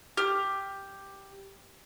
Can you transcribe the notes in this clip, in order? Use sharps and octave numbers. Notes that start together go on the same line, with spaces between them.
G4 F6